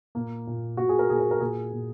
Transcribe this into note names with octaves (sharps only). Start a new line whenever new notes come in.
A#2 A#3
A#2
A#2 F#4
G#4
A#4
A#2 G#4
A#4
A#4
A#2 G#4
A#2